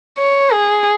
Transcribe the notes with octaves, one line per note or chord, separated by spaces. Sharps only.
C#5
G#4